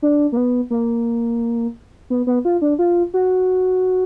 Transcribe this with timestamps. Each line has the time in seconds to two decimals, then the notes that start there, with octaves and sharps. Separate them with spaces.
0.02 D4
0.32 A#3
0.37 B3
0.70 A#3
2.10 B3
2.27 B3
2.45 F4
2.62 D4
2.79 F4
3.14 F#4